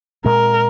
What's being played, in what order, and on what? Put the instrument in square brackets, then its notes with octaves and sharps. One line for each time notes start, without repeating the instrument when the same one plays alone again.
[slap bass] A#2 G#3 C4 [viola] A#4